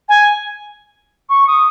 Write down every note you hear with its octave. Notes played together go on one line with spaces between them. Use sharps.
G#5
C#6
D#6